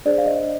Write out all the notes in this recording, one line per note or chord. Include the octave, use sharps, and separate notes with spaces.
D4 G#4 C5 D5
F5
D#5